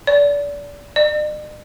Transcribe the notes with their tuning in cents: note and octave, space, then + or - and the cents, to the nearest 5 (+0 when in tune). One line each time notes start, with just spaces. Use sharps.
D5 -30
D5 +45